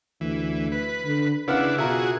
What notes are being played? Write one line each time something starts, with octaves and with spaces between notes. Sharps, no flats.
D2 E3
B4
D3
C#3 B3 D4 E4 F5 F#5
B2 F4 F#4 G#4 A#4 E5